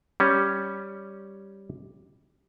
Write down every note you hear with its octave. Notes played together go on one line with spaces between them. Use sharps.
G3 C#4